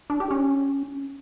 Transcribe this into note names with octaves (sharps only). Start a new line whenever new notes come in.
D4
G4
C#4